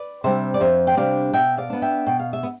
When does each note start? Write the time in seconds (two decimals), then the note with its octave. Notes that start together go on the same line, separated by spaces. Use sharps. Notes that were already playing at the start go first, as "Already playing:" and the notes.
Already playing: B4 D5
0.24 C3 G3 D4 C5 E5
0.54 D5
0.60 F2 C5 E5
0.87 G5
0.97 C3 G3 D4 D5 F5
1.33 B2 E5 G5
1.58 D5 F5
1.70 B3 D4
1.82 E5 G5
2.07 B2 G5
2.20 F5
2.33 E5
2.43 B3